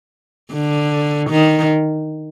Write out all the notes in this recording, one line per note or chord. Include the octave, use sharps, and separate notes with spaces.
D3
D#3